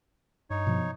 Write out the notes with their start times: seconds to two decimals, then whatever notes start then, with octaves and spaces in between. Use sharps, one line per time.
0.50 G2 D#4 C#5
0.67 B2 F3